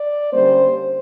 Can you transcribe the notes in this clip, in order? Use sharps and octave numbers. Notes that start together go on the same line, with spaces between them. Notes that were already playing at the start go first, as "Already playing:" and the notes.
Already playing: D5
D3 G3 A#3 C#4 C5